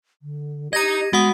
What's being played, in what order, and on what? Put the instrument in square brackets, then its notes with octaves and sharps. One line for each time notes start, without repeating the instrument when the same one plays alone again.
[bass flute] D3
[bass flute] G4 [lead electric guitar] D#5 A#5 [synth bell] G#6 A#6 D#7
[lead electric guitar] G#3 [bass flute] B3 [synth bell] F#4 F#5 D#6